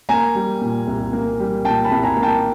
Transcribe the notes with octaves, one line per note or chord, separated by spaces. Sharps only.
A#3 G#5 A#5
G3
A#2
C2
A#3
G3
A#2 G5 A5
A5 B5
C2
G#5 A#5
A#3
G5 A5